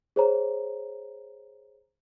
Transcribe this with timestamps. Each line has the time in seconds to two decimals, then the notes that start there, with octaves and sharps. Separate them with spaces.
0.16 G#4 C5 C#5 A#5